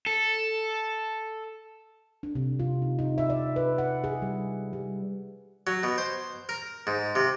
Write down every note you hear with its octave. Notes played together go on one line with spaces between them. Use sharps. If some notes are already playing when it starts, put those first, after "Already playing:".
A4
D4
C3
F4
D#4
D#4
E5
D5
B4
F#5
G#4
G3
G3
F#3
B2
C5
A#4
G#2
C3